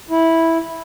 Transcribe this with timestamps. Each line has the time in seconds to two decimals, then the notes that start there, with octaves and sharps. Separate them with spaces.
0.10 E4